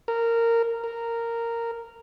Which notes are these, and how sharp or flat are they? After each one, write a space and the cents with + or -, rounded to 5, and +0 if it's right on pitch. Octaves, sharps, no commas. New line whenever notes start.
A#4 -15
A#4 -10